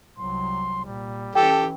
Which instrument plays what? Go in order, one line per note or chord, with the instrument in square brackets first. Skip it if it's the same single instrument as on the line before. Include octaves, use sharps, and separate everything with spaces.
[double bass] C2 F#3 [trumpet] C6
[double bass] A#2 [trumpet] G3
[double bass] E3 C#4 [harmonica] G4 A4 [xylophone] G5